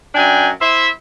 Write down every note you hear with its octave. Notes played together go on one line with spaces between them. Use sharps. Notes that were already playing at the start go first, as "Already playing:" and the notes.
F#2 D4 G5 G#5
E4 C5 E5